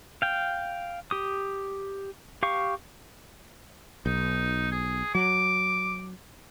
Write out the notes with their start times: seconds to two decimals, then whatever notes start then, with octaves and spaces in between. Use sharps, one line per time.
0.22 F5 G5
1.11 G4 D#6
2.43 G4 F5 C#6
4.06 B1 D#4
4.72 G#4
5.15 F#3 D6